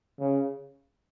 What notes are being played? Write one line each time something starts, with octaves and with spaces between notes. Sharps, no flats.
C#3